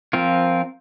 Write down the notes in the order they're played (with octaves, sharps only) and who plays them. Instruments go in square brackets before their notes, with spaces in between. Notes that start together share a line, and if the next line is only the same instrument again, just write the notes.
[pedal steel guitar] F3 C4 F4 A#4